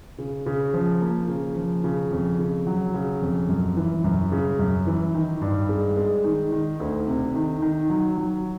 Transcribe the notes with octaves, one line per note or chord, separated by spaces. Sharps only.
C#3
C#3
F3
A#3
C#3
F3
C#3
F2
C#3
F#3
C#3
F2
F#2
E3
F#2
C#3
F#2
E3
D#3
G2
G#3
G#3
D#3
D#3
D2
C3
D#3
D#3
F#3
F#3